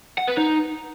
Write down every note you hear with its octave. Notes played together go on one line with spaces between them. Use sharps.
F#5
B4
D#4